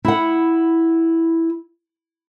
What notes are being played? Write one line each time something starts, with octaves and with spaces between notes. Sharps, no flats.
E4 F#5